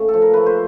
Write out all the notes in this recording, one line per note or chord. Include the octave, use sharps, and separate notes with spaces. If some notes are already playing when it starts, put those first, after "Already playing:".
Already playing: C#3 A3
A4
F3
A#4
A3 B4
C5